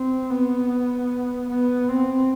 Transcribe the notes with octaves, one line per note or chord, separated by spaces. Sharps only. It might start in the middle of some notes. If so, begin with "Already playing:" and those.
Already playing: C4
B3
B3
C4